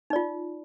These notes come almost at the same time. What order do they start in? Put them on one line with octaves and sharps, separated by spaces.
D#4 D5 F4